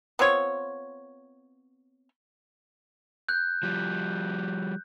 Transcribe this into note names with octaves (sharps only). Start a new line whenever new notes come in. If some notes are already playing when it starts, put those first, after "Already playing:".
B3 C4 F4 C#5
F#6 G6
F3 G3